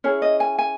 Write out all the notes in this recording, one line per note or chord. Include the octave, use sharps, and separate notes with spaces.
C#4 E4 G#4 C#5
D#5
G#5
G#5